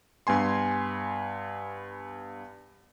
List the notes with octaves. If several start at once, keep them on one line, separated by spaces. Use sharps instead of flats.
G2 B3 G#5 C6